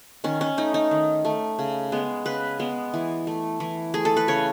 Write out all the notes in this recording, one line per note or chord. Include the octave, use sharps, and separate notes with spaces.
D#3 C#4
C#4
A3 D#4
D#4
D#3
A3
C#3
G#3 B3
C#3 B4
G#3 B3
E3
A3
E3
A3 G#4
A4
B4
C#3 C#5